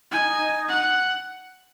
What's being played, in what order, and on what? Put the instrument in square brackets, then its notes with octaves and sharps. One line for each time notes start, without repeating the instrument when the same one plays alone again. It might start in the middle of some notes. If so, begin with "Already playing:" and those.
[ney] E4 [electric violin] G#5
[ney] D#4
[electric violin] F#5